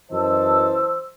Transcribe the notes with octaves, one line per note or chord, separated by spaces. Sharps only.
F#2 E3 C5 D#5 A5 E6